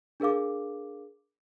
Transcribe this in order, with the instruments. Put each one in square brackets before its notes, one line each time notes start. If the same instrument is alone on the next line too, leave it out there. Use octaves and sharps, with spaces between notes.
[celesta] D4 G#4 A#4 F5 D6